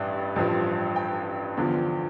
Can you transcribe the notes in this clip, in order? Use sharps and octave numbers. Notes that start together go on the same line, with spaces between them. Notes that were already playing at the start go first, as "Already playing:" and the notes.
Already playing: A1 G2 D5 E5
A1 G2 F3
G5
E2 D3 F3